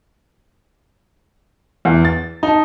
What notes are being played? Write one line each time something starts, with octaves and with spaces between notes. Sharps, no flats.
E2
A6
D#4 A5